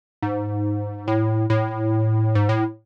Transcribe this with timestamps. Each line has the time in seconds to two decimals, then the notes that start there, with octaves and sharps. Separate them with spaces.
0.22 G#2
1.08 A2
1.50 A2
2.35 G#2
2.49 A2